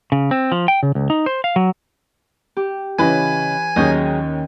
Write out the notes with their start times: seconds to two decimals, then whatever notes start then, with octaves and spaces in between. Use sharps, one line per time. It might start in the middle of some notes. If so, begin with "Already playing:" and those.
0.12 C#3
0.31 C4
0.52 F3
0.68 G5
0.83 C#3
0.95 C#2
1.10 D#4
1.26 C5
1.44 F5
1.56 F#3
2.57 G4
2.99 C#3 E3 C#4 B4 D#5 G#5
3.76 D#2 D#3 F#3 C#4 G#4 C#5 D#5 G6